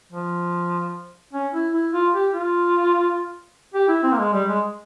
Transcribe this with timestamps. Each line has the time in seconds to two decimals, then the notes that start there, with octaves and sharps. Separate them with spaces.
0.12 F3
1.33 C#4
1.54 E4
1.73 E4
1.93 F4
2.14 G4
2.33 F4
3.74 G4
3.88 E4
4.03 C4
4.12 A#3
4.18 G#3
4.33 G3
4.49 G#3